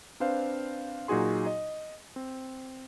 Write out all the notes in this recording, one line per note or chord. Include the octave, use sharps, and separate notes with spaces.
C4 D4 B4 C5 F5
A#2 F#3 D#4 F#4 G#4 C6
D#5
C4